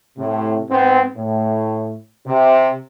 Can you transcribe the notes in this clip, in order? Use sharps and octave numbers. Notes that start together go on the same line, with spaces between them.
A2 C3
G#2 B3 C4
A2
C3